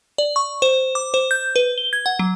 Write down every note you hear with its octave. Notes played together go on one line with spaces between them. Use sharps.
D5
C#6
C5
D6
C5
G6
B4
G7
G#6
F#5
F#3